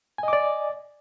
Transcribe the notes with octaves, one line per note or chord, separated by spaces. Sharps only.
D5 D#5 G#5 D6